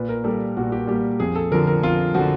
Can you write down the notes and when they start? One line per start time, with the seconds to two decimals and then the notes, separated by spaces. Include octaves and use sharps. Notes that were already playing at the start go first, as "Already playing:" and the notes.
Already playing: A#2 B4
0.09 A#4
0.24 G3 A#3 A4
0.57 A#2 F#4
0.72 G4
0.87 G3 A#3 G4
1.20 F2 G#4
1.36 A4
1.52 D3 F3 A#4
1.67 A#4
1.83 F2 F4
2.14 D3 F3 F#4